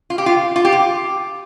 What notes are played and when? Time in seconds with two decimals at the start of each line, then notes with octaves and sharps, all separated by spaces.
0.10 F4
0.18 G4
0.26 F4
0.56 F4
0.65 G4
0.72 F4